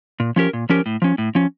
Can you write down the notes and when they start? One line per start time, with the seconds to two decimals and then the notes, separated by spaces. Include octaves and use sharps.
0.20 A#2
0.36 F3 C#4 G4 A#4
0.53 A#2
0.69 F3 C#4 G4 A#4
0.86 A2
1.02 F3 C#4
1.18 A2
1.35 F3 C#4